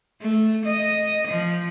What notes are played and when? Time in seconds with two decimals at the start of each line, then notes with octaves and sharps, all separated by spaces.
0.21 A3
0.66 D#5
1.28 F3